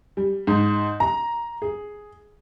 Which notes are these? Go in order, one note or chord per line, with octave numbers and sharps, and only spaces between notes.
G3
G#2
A#5
G#4